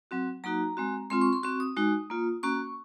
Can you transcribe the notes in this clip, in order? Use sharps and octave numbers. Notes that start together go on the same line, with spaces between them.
F#3 C4 F#4
F#3 A#3 D#4 F#4 A#5
G#3 C4 F#4
G#3 C4 F4 C6
C#6
C6
C4 F#4 C#6
D#6
G#3 D#4 F#4
A#3 F4
A#3 C#4 F#4 C#6